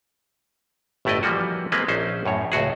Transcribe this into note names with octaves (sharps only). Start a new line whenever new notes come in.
G1 A2 A3 E4 D5 D#5
E3 F3 G3 A#3 F#4
G#3 A#3 C4 B4
A#1 C#4 D#4 C5
F#2 A2 C#5
C#2 A2 F#4 G#4